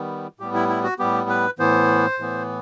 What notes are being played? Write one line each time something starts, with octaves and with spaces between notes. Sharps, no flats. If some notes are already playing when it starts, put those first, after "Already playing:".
Already playing: D#3 G3 B3
A2 G3 B3 G4
E4
E4
F#4
A2 G3 B3 G4
B4
A2 E3 B3 C5
A2 E3 B3